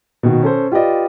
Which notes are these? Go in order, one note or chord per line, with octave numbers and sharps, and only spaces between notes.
B2 D#3 F#4
C#4 A4 C5
F4 G4 B4 D5 D#5